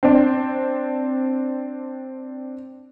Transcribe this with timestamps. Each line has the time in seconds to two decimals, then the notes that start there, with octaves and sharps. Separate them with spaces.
0.03 C4 D4